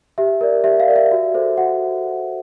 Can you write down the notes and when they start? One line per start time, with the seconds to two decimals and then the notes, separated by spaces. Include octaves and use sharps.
0.18 G4 E5
0.41 A#4 D5
0.64 G4 E5
0.80 F5
0.88 A#4 D5
0.96 E5
1.12 F#4
1.34 A4 C5
1.57 F#4 F#5